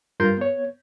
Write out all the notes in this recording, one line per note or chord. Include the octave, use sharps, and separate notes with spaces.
G2 F4 A#4 F5 C6 G6
B3 C#5